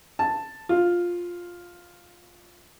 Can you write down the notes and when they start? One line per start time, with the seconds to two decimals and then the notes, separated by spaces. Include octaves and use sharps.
0.19 A5
0.69 F4